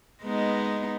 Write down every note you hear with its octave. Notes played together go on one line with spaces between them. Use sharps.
G#3 B3 D#4